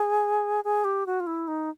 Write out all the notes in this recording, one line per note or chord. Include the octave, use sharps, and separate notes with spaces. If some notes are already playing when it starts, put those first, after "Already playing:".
Already playing: G#4
G#4
G4
F#4
F4
E4
D#4